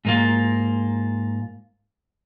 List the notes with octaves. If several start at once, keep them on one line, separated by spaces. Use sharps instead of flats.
G#2 A#3 F4